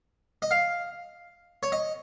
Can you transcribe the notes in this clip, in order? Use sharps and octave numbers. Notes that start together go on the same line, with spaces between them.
D#5
F5
C#5
D#5